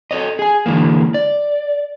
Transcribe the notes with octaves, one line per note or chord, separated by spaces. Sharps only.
A4 B4 C#5 D#5
G#4 G#5
D3 E3 G#3 A#3
D5